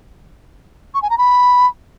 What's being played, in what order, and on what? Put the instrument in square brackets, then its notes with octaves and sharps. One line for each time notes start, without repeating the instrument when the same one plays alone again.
[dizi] C#6
G#5
A#5
B5